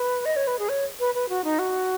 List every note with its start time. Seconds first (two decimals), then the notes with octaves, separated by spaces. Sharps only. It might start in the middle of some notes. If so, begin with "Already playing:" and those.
Already playing: B4
0.25 D#5
0.36 C#5
0.47 B4
0.59 G#4
0.69 C#5
1.00 B4
1.15 B4
1.29 F#4
1.44 D#4
1.59 F#4